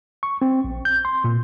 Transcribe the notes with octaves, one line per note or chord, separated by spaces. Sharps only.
C#6
C4
A#1
G6
C6
A#2